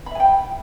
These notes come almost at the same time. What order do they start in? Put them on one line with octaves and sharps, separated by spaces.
B5 E5 G#5 G5